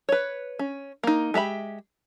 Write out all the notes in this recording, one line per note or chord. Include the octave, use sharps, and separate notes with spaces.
B4 C#5
C#4
A#3 D#4
G#3 G4 E5 B5